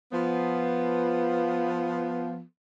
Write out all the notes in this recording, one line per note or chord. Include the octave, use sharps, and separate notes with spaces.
F3 B3